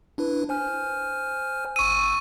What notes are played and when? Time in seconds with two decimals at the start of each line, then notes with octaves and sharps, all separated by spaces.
0.18 D4 E4 B4
0.49 C5 G#5 F6
1.76 G1 C#6 E6 D#7